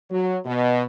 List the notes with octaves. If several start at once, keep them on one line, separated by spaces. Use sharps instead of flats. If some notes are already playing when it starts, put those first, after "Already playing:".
F#3
B2